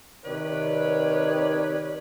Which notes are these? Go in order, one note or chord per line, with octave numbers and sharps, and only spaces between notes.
C3 D#3 B4 C#5 D5